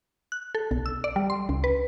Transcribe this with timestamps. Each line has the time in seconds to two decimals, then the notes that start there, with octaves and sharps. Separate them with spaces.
0.32 F#6
0.55 A4
0.71 B1
0.86 E6
1.04 D5
1.16 G3
1.30 C6
1.49 C#2
1.64 B4